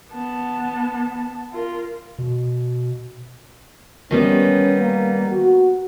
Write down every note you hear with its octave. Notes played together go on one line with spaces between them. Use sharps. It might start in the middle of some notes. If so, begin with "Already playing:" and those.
B3 A5
F4 A#4
B2
D#3 G3 B3 C#4
A#3
F#4